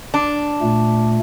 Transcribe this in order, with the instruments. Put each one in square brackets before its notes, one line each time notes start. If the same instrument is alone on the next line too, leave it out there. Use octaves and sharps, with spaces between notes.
[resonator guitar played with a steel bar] D4
[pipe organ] A#2 A3